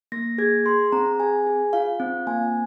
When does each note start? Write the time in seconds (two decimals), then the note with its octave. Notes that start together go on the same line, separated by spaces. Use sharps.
0.12 A#3 A#6
0.38 G#4 G#6
0.65 G#4 C6
0.92 C4 A#5
1.20 G#4 G#5
1.47 G#4
1.73 F4 F5
2.00 C4
2.27 A#3 G#5